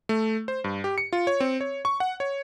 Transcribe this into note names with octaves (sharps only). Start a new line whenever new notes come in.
A3
C5
G2
G4
C#7
F4
C#5
C4
C#5
C#6
F#5
C#5